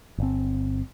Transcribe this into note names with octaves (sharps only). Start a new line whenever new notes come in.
G1 C4